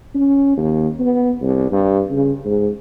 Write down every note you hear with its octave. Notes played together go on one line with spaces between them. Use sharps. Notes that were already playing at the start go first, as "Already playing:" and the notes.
C#4
D#2
B3
C2
G2
C#3
G#2